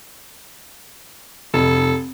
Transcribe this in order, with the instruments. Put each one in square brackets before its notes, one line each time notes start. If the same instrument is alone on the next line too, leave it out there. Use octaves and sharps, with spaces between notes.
[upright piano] F1 [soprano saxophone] A4